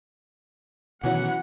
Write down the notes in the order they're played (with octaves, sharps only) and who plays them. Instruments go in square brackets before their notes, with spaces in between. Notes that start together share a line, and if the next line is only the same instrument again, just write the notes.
[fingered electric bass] B2 D#3 [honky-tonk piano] E3 F#3 C#4 [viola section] F#5